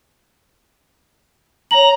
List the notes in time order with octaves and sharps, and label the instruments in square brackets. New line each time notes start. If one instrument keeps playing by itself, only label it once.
[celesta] C#5 F#7 [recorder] A#5